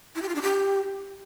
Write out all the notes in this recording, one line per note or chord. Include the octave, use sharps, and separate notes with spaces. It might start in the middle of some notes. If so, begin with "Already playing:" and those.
E4
G4
F4
D4
G4